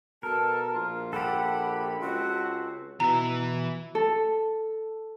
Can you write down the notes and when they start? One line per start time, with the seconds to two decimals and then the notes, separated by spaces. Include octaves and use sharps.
0.23 B2 A4 A#4 A5
0.74 A#1 F4
1.13 G4 A4 F#5 B5
2.01 C#2 C4 F#4
3.00 B2 E3 E5 A#5
3.95 A4